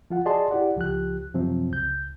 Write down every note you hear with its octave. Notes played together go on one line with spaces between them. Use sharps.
F3 F4 F#5
F#4 G#4 D5 D#5 A5 C6
E4 G4 D5 F#5
C#2 F3 G4 F#6
F#2 C3 F3 F#3 C4
C#2 G6